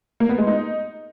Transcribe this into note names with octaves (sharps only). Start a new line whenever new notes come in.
A#3
B3
G#3
D#4